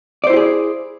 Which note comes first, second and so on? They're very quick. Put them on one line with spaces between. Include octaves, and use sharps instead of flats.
D5 C5 E4 G4 G#4